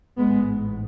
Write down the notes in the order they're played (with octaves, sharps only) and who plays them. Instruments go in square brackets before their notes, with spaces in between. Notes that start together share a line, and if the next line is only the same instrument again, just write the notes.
[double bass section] A1 G#2 G#3 B3